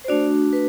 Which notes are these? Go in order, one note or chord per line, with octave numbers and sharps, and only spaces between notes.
C5
A3 D4 F#4 D5
B4